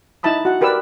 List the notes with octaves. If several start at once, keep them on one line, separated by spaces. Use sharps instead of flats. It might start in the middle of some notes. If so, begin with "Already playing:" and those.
D#4 E4 E5 A5 B5 D#6
F#4 F#5
G4 A#4 B4 D5 E6